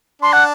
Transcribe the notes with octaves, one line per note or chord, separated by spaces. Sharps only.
D4 C6
F#5